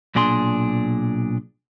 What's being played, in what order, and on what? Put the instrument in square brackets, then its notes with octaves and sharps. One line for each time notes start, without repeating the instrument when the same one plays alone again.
[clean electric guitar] B1 A#2 D4 G#4 C6